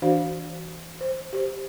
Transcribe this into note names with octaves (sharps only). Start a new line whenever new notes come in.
E3 D4 F#4 C5 F5
C5
G4 C5